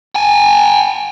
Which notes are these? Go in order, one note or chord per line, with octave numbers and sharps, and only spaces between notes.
G5 G#5